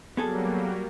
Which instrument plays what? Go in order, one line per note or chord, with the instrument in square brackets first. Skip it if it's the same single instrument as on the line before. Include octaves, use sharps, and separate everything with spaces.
[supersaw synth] F#3 G3 A#3 [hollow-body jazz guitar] B3 G#4 A4